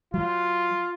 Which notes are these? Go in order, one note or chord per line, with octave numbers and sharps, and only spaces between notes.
F#3 F4